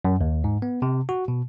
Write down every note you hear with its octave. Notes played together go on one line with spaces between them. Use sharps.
F#2
D#2
G#2
B3
C3
F#4
B2